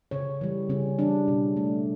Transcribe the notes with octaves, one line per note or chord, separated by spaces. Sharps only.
C#3 C#5
E3 G3
C#3 C#4
E3 G3 D4
B2
A3